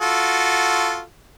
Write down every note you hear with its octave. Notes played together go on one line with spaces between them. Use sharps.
F4 F#4 A4